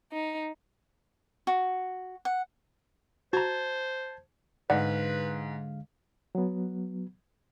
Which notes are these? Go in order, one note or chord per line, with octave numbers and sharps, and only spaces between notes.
D#4
F#4
F#5
F#4 C5 A5 A#5 G#6
G#2 D3 G#3 B4 D5 F5 F#5
F#3 B3